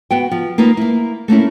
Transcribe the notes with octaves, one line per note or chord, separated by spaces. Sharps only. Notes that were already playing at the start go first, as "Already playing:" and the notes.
B3 F#4 G5
F3
A#3 D#4 F4 B4
A#3 E4
A3 A#3 C#4 E4